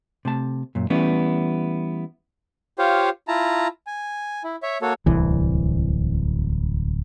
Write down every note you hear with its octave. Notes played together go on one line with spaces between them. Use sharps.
C3 A3 A5
F#2 A#2
E3 G3 A3 B3 C#4 E4
F4 G4 C5 C#5 F5
E4 F4 A5 A#5
G#5
E4
C#5 E5
A#3 F#4 A4 C#5
D1 C2 E3